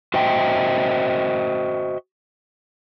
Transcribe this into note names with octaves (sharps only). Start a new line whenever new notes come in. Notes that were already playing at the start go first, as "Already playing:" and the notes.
F#4 C5 D#5 E5 G5